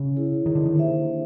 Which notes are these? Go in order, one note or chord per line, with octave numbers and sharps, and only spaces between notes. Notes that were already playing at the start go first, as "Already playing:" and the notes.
Already playing: C#3
E4 G#4 C#5
D#3
D3
D#3
A#3 D4 G4 C5 E5